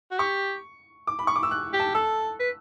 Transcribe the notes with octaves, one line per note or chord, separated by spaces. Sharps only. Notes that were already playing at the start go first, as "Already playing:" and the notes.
F#4
G4 C#6
D6
B5
C#6
D6
E6
F#6
G4
A5
A4 E6
B4